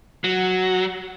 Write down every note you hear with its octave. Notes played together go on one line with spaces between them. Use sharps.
F#3